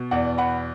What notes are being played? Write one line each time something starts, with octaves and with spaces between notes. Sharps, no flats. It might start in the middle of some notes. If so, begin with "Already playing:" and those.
Already playing: B2
E2 D5 F#5
F#5 B5